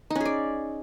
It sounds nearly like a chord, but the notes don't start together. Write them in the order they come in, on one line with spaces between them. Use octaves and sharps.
D#4 C#4 G#4 D5